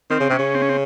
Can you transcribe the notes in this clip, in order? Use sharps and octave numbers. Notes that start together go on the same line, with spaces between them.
D#3 C4
C#3
C3 C#4
C#3
C4
C#4
C4